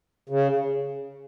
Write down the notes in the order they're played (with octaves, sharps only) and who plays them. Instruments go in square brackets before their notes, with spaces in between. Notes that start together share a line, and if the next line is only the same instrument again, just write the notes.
[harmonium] C#3